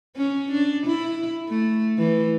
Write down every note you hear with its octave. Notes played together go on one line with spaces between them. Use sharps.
C#4
D4
E4
A3
E3